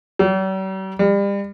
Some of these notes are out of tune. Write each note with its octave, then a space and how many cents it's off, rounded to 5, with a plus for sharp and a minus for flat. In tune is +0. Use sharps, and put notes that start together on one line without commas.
G3 -45
G3 +35